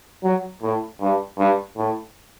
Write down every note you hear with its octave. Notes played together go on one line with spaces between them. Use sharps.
F#3
A2
G2
G2
A2